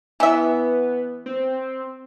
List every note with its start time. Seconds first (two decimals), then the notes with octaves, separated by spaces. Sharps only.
0.20 E3 B3 E5
1.26 C4